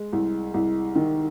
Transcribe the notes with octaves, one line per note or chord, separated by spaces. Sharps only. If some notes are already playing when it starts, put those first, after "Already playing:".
Already playing: G#3
C2
C2
D#3